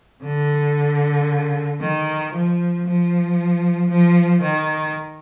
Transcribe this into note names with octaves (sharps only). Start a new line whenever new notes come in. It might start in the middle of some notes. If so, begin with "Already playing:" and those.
D3
D#3
F3
F3
F3
D#3